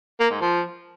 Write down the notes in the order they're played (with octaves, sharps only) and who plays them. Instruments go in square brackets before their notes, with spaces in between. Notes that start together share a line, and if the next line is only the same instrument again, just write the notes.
[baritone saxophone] A#3
G#2
F3